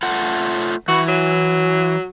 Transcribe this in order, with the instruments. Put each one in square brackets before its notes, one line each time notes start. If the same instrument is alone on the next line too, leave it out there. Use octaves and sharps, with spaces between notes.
[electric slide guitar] A3 F4 F#5
[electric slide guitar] E3 [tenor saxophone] F#4
[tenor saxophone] F#3